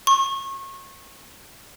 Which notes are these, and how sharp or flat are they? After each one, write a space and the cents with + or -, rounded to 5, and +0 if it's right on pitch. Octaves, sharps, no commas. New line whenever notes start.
C#6 -30